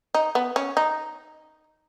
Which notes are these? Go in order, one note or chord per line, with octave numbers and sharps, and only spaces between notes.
D#4
B3
C#4
D#4